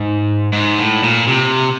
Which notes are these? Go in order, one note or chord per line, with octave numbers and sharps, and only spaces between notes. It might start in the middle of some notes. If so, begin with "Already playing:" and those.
Already playing: G#2
G#2
A2
A#2
C3